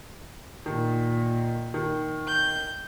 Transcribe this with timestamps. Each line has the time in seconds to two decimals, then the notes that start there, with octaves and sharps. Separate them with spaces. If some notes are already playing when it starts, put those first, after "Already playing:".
0.66 A#2 D#3
1.74 D#3
2.27 G6